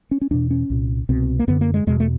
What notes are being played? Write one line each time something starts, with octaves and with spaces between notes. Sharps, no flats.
C#4
C#4
E2 B2 D4
C#4
C2 A#2
C2 B2 C4
A#3
F#2 D3 B3
A#3
G#3
E2 B2 G#3
A3